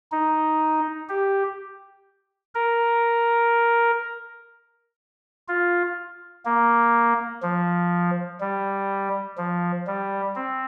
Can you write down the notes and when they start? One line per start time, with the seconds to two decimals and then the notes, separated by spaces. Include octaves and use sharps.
0.12 D#4
1.09 G4
2.55 A#4
5.48 F4
6.45 A#3
7.42 F3
8.41 G3
9.38 F3
9.87 G3
10.36 C4